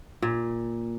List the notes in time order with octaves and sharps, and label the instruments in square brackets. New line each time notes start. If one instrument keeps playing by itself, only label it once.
[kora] A#2